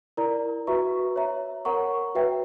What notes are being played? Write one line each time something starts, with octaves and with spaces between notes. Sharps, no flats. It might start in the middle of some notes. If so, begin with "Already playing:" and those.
E4 A#4 D5 A#5
F#4 B4 E5 A#5 C#6
C#5 E5 A#5
A#4 C#5 F#5 A#5 C#6
F#4 B4 E5 G5